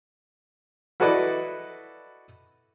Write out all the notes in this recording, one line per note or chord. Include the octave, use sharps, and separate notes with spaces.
E4 F#4 A4 B4 D5 D#5